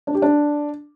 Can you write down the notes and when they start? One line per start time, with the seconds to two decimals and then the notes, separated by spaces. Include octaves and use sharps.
0.07 D4
0.15 G4
0.22 D4